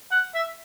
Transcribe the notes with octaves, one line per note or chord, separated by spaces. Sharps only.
F#5
E5